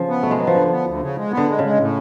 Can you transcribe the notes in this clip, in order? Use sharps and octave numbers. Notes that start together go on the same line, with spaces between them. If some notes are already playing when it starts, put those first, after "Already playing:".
Already playing: C#3 F3
B3
B2 A3
G#3
F#3 B3
F3
D2 D3
B3
D2
C#3
G#3
B3
D3
G#3
C#3
G#3
A2